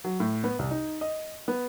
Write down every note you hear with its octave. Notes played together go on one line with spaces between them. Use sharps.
F#3
A2
B3
C2
D#4
D#5
B3